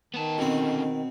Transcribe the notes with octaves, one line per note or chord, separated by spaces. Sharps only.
D#3 B3 A5
B2 D3 C4 C#4